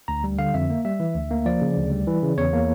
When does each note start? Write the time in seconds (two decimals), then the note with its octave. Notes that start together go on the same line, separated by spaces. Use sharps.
0.08 D2 A#5
0.24 G3
0.39 D3 F5
0.54 F2 E5
0.70 A#3
0.85 G3 E5
1.00 E3
1.15 D2
1.31 A#3
1.46 F3 D5
1.61 C#3
1.77 D2
1.91 G3
2.07 E3
2.23 C#3
2.38 E2 C#5
2.53 A#3